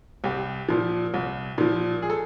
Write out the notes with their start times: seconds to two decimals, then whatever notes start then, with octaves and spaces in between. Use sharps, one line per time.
0.24 C2 G4
0.69 A#2 F3
1.14 C2
1.58 A#2 F3
2.02 G#4
2.10 A4